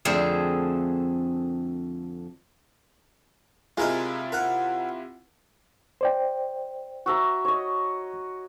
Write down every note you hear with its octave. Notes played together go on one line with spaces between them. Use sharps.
F2 D3 A3 C4 G#4
C3 G#3 E4 F4 A#4 D#5
A#4 F#5
C5 D5 G5
F#4 E5 A#5
C#5 D#5